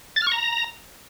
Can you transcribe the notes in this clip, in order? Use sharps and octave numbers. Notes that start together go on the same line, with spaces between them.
A6
F6
C#6
A#5